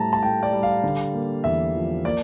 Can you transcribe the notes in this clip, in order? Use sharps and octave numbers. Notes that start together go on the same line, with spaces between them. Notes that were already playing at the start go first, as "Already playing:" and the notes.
Already playing: A2 G3 A5 A#5
A5
A2 G5
D5
G3
F5
D3
A#3
E2 E5
F3
A#3 D5